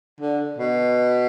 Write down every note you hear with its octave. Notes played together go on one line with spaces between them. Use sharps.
D3
B2